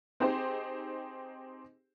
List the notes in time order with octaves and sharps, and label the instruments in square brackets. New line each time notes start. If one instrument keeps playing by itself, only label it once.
[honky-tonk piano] C4 D#4 G4 G#4 C5